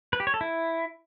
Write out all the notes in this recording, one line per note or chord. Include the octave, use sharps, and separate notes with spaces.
B4
G4
C#5
A4
E4